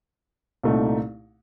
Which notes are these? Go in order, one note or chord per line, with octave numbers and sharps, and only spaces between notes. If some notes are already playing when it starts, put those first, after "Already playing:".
C2 A#2 A3 D#4